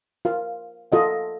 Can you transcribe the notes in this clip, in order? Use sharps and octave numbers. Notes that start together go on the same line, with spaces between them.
F4 A#4 F5
F4 A4 D#5 F#5